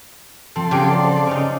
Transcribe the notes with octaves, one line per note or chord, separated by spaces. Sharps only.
F3 C4 A4 C6
C#3 F#3 G4 G#4 D6 A#6 D7
F4 F#4 C5 D5
C#3 C#4 D#4